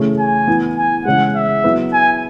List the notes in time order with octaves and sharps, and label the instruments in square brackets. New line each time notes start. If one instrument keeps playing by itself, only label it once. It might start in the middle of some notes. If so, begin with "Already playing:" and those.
Already playing: [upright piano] C#3 E3 A3 C#4 G#4
[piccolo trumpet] G#5
[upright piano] E3 B3 E4
[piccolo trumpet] G#5
[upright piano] C#3 E3 G#3 [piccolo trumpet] F#5
[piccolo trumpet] E5
[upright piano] F#3 B3 E4 B4
[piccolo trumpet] G#5